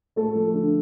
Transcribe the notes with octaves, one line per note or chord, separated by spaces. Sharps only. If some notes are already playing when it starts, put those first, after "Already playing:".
A3 A4
F3
D3